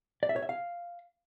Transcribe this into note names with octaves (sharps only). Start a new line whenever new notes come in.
D5
E5
C#5
E5
F5